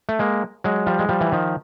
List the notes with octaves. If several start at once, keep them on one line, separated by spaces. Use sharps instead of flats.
A3
G#3 A#3
F#3 G#3
F3 G3
G#3
F3 G3
E3
D#3 F3